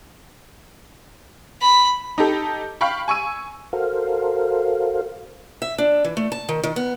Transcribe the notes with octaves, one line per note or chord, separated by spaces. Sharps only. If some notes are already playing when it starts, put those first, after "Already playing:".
B5
D#4 G4 A4
F5 G5 B5 C#6
G#5 C#6 E6 D#7
F#4 A4 A#4 C5 F5
E5
D4
E3
A3
A5
D#3
D#3
B3